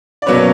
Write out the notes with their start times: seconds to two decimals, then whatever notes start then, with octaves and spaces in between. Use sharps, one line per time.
0.22 D5
0.26 B2 F#3 A#3 C#4 B4 C#5